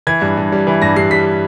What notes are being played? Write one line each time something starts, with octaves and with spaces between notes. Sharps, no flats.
E3 G#6
G2
G2
G3
E3
G2 A#6
G2 C7
G3 B6